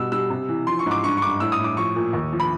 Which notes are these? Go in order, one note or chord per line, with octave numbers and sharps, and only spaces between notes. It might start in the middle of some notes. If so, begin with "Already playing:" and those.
Already playing: B2 G3 E6
G3 E6
C3
E3
F3 C6
C#6
G#2
D6
G2 C#6
C#6
G2 D6
A2 E6
D#6
A2
D6
F3 C#6
A#2
D#2
F3
B5